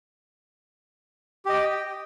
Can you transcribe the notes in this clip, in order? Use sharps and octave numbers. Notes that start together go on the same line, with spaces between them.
G4 D#5 G5